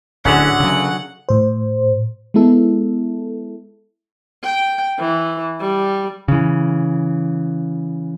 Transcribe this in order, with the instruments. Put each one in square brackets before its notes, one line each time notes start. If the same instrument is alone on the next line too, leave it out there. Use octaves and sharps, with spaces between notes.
[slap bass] D1 [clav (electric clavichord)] D3 C#4 [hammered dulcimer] F#4 G#4 E5 [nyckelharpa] F#5
[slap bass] C#3 F#3
[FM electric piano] A2 C5
G#3 B3 E4 A4
[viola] G5
E3
G3
[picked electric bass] C#3 E3